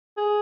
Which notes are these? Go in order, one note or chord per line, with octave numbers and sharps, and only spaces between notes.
G#4